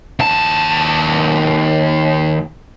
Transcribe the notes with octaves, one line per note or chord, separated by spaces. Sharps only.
D#2 A5